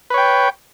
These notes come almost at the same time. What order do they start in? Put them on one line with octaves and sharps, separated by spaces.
B4 C#5 G5